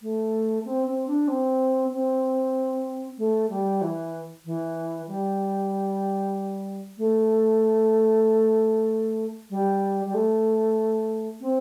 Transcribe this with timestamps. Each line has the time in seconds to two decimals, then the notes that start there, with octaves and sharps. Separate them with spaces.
0.02 A3
0.65 C4
0.87 C4
1.07 D4
1.28 C4
1.92 C4
3.18 A3
3.50 G3
3.82 E3
4.45 E3
5.08 G3
6.98 A3
9.50 G3
10.05 G3
10.14 A3
11.41 C4